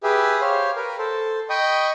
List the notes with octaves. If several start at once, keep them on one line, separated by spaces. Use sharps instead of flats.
G4 G#4 B4 E5
G4 C5 C#5 F5
A#4 B4
A4 C5
D#5 G5 B5 C#6 D#6